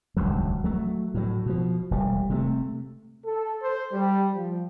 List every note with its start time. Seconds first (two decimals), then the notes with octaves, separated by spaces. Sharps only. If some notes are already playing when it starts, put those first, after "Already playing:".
0.17 D#1 C#2 G2 F#3
0.64 F#3 A3
1.14 A2 F#3
1.46 B2 F3
1.91 E1 G3
2.30 C3 G3 A3
3.25 A4
3.61 C5
3.92 G3
4.35 F3